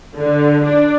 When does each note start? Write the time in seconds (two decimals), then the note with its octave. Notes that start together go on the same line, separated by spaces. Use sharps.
0.15 D3
0.64 D4